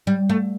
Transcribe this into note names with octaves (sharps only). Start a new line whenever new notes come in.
G3
A3